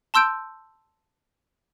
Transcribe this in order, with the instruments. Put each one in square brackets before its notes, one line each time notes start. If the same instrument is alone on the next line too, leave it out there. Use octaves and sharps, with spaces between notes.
[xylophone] A5 C6 E6 G6 D7